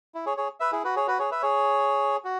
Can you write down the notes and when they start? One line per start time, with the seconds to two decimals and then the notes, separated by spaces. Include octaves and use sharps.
0.15 E4
0.26 G#4 C#5
0.37 G#4 C#5
0.60 B4 E5
0.72 E4 G#4
0.84 F#4 B4
0.96 G#4 C#5
1.07 F#4 B4
1.19 G#4 C#5
1.31 B4 E5
1.42 G#4 C#5
2.25 F#4